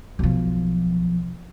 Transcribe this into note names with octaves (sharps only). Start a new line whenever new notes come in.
B1 F3